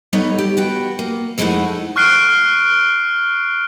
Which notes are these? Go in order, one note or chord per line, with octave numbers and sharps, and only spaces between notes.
G3 B3 D#4 A4 C#5 D#5
G4
B3 F#4 G5
A#3
F2 G#3 A3 D#4 E4 F#5
C#6 F6 F#6 C7 D7 G7